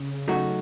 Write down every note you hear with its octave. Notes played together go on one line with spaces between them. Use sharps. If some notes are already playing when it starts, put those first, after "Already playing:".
Already playing: C#3
F#3 A3 D#4 F#4